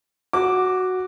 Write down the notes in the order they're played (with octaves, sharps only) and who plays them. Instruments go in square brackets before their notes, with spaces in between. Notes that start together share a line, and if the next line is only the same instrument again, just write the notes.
[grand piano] F#4 D6